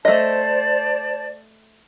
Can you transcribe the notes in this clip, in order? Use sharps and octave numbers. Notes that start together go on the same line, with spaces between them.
A3 C5 D5 D#5 A5